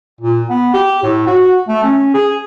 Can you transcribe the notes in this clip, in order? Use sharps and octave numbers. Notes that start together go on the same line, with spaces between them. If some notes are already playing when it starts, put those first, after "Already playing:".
A#2
B3
G4
A2
F#4
A3
C#4
G#4